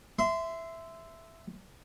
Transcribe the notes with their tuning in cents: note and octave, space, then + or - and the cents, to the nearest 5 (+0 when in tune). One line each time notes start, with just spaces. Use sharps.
E5 +0 C6 -20